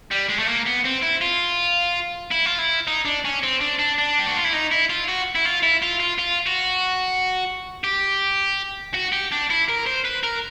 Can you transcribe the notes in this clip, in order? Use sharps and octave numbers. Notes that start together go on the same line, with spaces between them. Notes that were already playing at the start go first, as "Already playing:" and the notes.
G3
G#3
A3
A#3
B3
C4
E4
F4
E4
F4
E4
D#4
D4
C#4
C4
D4
D4
D4
G4
F#4
F4
E4
D#4
E4
F4
F#4
E4
F4
E4
F4
F4
F4
F#4
G4
F#4
G4
D4
E4
A#4
C5
B4
A#4